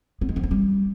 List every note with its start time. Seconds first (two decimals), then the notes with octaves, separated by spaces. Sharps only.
0.21 B3
0.29 G#3
0.36 F3
0.44 D4
0.51 G3